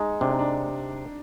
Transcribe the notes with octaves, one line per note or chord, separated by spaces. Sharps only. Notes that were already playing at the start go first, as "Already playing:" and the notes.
Already playing: G#3 D#4
C3 D4
D#4
D4